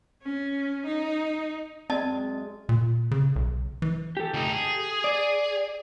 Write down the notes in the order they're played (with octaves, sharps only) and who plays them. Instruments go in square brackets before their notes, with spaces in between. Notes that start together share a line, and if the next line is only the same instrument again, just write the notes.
[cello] C#4
D#4
[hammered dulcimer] F#2 G#3 [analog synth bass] C4 [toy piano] D5 D#5 A5
[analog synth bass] A#2
C#3
B1
E3
[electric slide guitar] G4 A4
[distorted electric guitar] D2 D#4
G#4
[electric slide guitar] D5